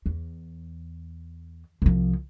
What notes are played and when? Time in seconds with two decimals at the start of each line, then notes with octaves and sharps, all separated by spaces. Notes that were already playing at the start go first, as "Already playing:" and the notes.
0.06 E2
1.82 C2 F3